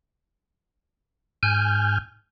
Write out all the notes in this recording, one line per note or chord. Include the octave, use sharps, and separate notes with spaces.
G#2 G#5 F6 G6